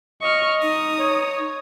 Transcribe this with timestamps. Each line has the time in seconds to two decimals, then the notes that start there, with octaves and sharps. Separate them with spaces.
0.22 D#5 C#6 F6
0.62 D#4 A#5 D#6
0.99 C#5